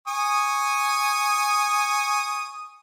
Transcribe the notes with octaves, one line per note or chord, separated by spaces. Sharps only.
G#5 C#6 D#6